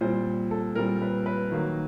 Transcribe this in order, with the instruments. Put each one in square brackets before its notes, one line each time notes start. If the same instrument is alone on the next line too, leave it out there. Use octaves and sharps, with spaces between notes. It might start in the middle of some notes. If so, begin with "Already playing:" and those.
[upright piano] A#2 G3 C4 C5
A4
A#2 G3 C4 A#4
B4
B4
D#3 F#3 A#3